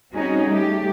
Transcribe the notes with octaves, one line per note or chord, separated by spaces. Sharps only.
G3 C4 C#4 D#4 F#4 G#4
G3 A3 G4